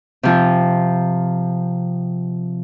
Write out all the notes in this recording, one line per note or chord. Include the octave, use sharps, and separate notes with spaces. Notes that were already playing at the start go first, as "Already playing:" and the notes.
C3 F3